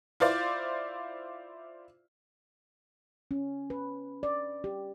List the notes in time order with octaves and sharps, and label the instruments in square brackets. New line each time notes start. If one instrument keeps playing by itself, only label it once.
[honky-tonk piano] E4 F4 C5 D5
[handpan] C#4
B4
D5
G4